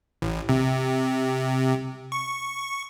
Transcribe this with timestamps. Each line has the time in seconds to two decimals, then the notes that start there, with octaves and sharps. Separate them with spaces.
0.22 A1
0.49 C3
2.12 C#6